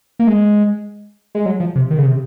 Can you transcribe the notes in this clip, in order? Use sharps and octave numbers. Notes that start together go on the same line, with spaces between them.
A#3
G#3
G#3
F#3
F3
C3
D#3
C#3
C3